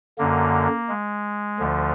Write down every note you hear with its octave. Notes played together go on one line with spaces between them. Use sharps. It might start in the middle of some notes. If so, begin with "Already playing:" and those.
F#2 D3 A#3
G#3
D2 D3 F3